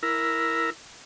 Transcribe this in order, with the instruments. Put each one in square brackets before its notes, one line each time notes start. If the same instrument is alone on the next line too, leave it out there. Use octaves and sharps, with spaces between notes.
[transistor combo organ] E4 A#4